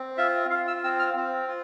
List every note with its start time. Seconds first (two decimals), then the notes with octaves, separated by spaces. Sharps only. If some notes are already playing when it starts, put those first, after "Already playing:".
Already playing: C4
0.17 F4 E5
0.50 F4 F5
0.68 E6
0.84 C4 E6
0.99 F6
1.17 C4
1.48 F4